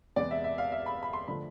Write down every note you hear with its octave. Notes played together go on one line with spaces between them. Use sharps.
E2 C3 G#3 B3 D5
E5
E5
F5
E5
B5
B5
C6
D3 F3 A3 B5